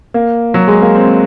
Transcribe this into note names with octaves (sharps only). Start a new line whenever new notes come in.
A#3
F#3
G#3
A#3
C4